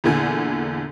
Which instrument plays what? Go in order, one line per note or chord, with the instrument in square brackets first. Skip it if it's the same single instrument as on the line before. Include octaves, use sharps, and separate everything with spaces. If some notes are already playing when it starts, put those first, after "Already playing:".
[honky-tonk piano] E2 A#2 D3 G#5